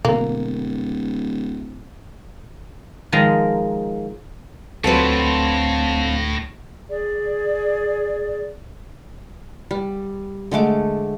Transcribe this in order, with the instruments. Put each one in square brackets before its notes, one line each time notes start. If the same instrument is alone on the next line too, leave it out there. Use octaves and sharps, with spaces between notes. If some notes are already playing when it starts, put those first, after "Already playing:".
[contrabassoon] D1 [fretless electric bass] B2 D3 [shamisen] A#3
[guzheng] D#3 F3 G#3 A#4
[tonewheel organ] D2 A#6 [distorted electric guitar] A2 [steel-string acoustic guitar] F#3 C4 F4 [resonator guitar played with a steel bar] A4 B4
[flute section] G#4 D5
[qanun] G3
D3 G#3 A3 D6